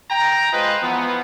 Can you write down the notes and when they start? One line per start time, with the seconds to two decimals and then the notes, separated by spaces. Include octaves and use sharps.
0.11 G5 A#5
0.53 G#3 F4 B4 C5 D#5
0.82 E3 F3 B3